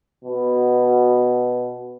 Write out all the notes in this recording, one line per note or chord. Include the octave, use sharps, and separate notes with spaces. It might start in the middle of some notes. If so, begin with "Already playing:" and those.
B2